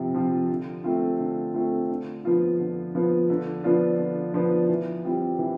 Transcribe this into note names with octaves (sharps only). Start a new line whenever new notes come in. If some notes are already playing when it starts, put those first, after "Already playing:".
Already playing: C3 F3 C4 F4
F3 C4 F4
D3
A3 C4 F4
D3
A3 C4 F4
D3
F3 B3 F4
D3
F3 B3 F4
D3
F3 B3 D4 F4
D3
F3 B3 D4 F4
E3
G3 C4 F4
E3